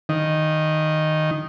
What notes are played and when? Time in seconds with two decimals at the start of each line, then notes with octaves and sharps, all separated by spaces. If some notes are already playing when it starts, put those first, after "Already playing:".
0.09 D#3